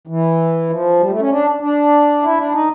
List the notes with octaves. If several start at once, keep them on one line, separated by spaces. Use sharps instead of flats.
E3
F3
G3
A3
C#4
D4
D4
E4
D4
D#4